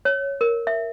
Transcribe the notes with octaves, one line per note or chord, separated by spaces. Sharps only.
C#5
A#4
E5